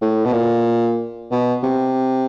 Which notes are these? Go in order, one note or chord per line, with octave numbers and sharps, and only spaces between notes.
A2
B2
A#2
B2
C3